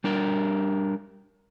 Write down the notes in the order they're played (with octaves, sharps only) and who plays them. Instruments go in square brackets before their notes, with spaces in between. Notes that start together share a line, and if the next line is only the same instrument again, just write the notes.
[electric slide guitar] G3 D4 A#4